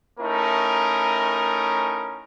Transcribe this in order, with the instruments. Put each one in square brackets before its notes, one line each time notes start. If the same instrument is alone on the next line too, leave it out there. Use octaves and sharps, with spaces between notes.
[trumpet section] A3 C#4 D#4 E4 A#4